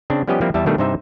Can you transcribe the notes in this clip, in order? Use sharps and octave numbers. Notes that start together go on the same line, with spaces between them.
C#3 C4 D4
F3 G3 B3 C#4 G4 D#5
F3 G3 A#3 C4 E4
E2 G3 E4 E5 A5
B2 D#3 G3 A3 D4
G2 C3 D#4 C5 E5